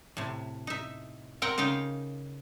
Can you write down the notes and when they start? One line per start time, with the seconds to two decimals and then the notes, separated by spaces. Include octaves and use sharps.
0.17 A2 C3
0.67 D#4 E5
1.42 C4 A#4 F#5 G5
1.58 C#3 D#4 F5 G5